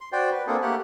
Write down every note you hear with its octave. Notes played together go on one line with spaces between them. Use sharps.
C6
F#4 C5 D5 G5
B4
A#3 C4 D4 G#4 A4
A3 A#3 G4 F#5